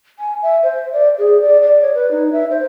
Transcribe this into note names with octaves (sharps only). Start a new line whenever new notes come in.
G#5
E5
C5
D5
G#4
D5
D5
C#5
B4
D#4
E5
C5